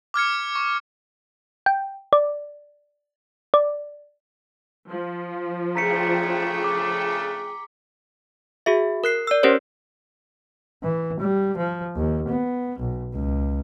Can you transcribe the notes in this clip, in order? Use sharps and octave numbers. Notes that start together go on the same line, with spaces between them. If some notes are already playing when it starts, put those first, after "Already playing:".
D6 F6 G#6 C#7
C#6
G5
D5
D5
F3
C#3 A3 D4 G#4 G5 A#5 B6 C#7
D6
F#4 G#4 E5
A#4 F#6 C7
D5 E6
C#4 G4 A#4 C5 C#5
E3
G3
F3
D#2
B3
B1
C#2